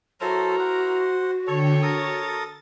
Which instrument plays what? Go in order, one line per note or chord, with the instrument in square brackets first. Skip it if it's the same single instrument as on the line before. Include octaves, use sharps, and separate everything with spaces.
[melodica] F#3 A4 C5 [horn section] E4 A#4 [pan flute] F#4
[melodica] C5 F#5
[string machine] D3 G5 [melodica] A4 [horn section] C#5
[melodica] A4 A#4 D#6 [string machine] A6